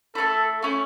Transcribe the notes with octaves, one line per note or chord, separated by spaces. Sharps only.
A3 C#4 E4 A4
A3 C#4 E4